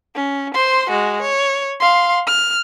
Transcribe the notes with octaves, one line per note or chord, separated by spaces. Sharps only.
C#4
C5 C6
G#3 F#4
C#5
F5 C6
F6